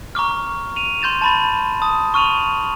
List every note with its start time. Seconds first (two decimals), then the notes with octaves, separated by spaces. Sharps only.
0.15 A#5 C#6 D6 F6
0.76 D#7 F7
1.01 C6 G6 A6 E7 F7
1.22 A5 B5 A6
1.82 A5 D#6
2.14 C#6 F6 D#7 F7 F#7